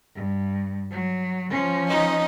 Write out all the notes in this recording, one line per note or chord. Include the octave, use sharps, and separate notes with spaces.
G2
F#3
F3 C#4
D#4 D#5